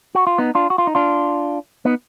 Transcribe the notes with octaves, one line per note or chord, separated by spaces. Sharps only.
F#4
F4
B3 D#4
D4 F4
F#4
F4
D#4
D4 F4
B3 D#4